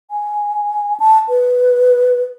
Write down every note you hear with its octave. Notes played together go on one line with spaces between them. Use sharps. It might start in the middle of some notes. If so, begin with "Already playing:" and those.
G#5
A5
B4